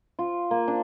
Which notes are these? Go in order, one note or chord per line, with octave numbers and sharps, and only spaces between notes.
F4
A#3
D4